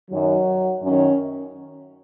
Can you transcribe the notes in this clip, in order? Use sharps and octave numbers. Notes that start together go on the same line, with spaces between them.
F#2 D#3 F#3
F#2 D#3 C#4